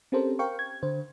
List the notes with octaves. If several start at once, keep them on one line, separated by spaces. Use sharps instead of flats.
C4 C#4 G4 A4 A#4 C5
A#4 C5 F5 G5 C#6
G#6
D3 C5